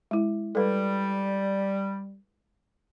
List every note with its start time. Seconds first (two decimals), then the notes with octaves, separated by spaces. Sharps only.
0.11 G#3 E4
0.55 G3 A4 B4